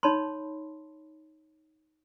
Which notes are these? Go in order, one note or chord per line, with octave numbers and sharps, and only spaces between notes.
D#4 C#5 A5 B5 C6